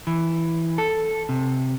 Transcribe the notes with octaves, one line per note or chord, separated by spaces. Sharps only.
E3
A4
C3